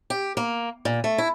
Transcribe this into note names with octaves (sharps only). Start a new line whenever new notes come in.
G4
A#3
A#2
A3
E4